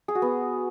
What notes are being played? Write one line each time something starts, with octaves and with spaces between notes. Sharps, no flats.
G#4
F#4
B3